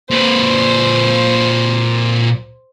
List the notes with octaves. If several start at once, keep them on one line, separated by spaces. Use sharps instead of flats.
A#2 B4 C5